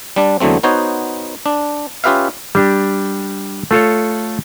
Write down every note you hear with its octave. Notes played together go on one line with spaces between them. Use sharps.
G3 D4
E2 D3 F#3 A3 C4
B3 D#4 F#4 C5 C#5
D4
C#4 F4 G4 B4 E5 F5
G3 D4 G4
A3 F4 A4 C#5